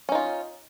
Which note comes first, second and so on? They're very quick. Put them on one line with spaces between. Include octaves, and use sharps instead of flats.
C#4 D#4 F4